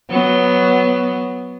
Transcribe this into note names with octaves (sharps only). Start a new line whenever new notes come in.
F#3 B3